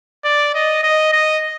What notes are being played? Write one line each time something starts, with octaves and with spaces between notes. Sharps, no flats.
D5
D#5
D#5
D#5